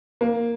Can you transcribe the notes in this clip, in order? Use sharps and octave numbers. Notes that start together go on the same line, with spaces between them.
A#3